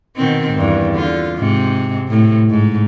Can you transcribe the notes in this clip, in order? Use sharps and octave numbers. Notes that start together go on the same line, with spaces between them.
B2 D#3 C4
E2 G2
D3 F4
G#2 C3
A2 C3
G#2